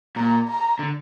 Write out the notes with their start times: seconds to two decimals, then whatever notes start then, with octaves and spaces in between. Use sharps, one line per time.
0.16 A#2 A#5
0.48 A#5
0.79 D3